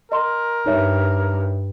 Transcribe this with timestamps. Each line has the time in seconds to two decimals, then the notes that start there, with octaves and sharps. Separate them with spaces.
0.12 A#4 D#5 C6
0.66 G2 D#4 C#5 E5